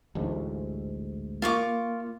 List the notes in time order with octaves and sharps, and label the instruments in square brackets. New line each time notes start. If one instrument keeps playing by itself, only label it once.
[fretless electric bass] A1 D2 G#2
[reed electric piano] A#3 [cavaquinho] F4 C#6 D6